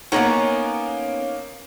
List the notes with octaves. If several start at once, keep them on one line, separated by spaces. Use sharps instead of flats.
A#3 B3 C#4 D#4 A#4 C#5 F#5 A#5